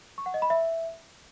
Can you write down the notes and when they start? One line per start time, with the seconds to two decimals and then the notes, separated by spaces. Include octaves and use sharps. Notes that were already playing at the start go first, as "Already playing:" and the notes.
0.18 C#6
0.26 F#5
0.34 D#5
0.42 B5
0.50 E5